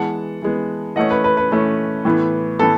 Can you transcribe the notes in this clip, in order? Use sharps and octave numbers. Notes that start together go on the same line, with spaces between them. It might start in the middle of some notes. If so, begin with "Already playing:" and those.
Already playing: E3 G#3 B3 F#5 A5
E3 G#3 B3
E3 A3 C#4 D#5 F#5
B4
B4
B4
E3 A3 C#4
A2 E3 B3
A2 E3 B3 A4